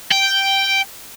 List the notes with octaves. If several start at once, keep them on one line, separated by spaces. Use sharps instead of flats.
G5